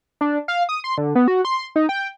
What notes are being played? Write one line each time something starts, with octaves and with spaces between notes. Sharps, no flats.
D4
F5
D#6
C6
D3
B3
F#4
C6
D#4
G5